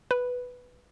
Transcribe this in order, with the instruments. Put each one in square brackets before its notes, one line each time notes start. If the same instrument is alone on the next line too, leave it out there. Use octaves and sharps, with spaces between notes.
[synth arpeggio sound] B4